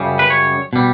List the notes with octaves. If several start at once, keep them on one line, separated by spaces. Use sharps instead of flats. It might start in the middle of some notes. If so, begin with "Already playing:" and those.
Already playing: F#2 C#3 G3
B4
C#5
B2 G3